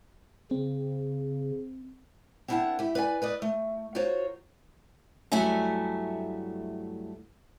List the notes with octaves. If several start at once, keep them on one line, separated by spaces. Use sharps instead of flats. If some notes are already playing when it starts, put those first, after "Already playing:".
C#3 C4
C4 D4 E4 A#4 F#5 A5
E4 G4
B4 D5 F5 G#5
B4 D5 D#5
A3
F4 F#4 A#4 C5 C#5
G2 F#3 A3 E4 E5 G#5